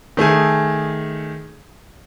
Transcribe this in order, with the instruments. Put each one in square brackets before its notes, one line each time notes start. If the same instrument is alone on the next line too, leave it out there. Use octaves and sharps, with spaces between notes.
[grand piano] D#3 A3 G#4 G#5